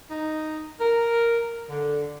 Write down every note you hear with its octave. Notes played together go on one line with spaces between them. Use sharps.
D#4
A#4
D3